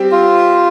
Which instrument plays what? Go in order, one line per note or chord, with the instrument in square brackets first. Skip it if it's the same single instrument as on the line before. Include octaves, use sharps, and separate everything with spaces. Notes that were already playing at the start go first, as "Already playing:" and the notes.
Already playing: [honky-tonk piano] G3 C4 G4
[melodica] F4